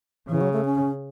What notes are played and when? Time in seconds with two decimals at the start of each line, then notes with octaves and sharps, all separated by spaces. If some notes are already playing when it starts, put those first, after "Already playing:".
0.28 C#3 E3
0.41 F#3
0.53 A3
0.65 C#4